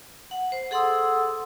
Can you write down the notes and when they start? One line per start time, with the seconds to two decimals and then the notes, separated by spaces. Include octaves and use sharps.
0.31 F#5
0.52 C5
0.71 G#4 A4 F#5 C6 D#6 E6